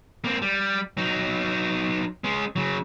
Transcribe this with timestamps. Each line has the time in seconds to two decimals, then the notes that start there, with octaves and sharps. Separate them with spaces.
0.24 A#3 C4
0.42 G3
0.97 F#3 D#4
2.24 G#3 C#4
2.56 C#3 F#3